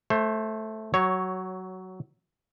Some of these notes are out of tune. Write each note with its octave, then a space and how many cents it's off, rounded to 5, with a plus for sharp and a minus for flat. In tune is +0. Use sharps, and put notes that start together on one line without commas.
A3 -5 C5 +25
F#3 +10 C#5 +0